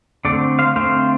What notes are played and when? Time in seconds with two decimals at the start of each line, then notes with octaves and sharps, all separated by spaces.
0.25 D3 A3 C4 A4 D5
0.59 C5 F5
0.76 D3 A3 C4 C5 F5